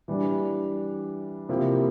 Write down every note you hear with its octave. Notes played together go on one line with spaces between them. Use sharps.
E3 G3 D4
C3 F3 A#3 E4 G4